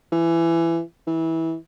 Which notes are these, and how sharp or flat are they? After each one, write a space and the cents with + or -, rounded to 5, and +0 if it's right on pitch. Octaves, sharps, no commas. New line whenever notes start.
E3 +20
E3 -20